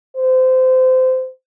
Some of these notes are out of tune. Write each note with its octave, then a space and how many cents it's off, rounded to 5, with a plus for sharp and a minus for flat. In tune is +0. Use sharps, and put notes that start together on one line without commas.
C5 -25